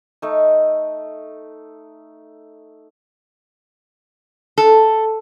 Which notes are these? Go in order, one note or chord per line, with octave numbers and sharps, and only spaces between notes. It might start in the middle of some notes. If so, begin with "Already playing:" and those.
A3 D#4
A4